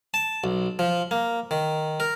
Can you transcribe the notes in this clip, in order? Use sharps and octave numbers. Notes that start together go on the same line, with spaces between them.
A5
B1
F3
A#3
D#3
A#4